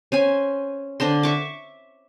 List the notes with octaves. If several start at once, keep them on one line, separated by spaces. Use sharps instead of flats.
C#4 C5 G#5
D3 D4 C5 C6
E5 C#6 D6